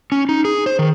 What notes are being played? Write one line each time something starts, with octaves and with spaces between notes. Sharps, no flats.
C#4
D#4
G#4
C5
D#3